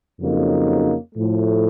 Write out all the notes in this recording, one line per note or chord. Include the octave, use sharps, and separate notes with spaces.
F2 C#3 F#3 A#3 D#4
A2 F3 A3